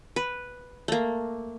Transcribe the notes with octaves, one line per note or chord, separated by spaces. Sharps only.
B4
A3 A#3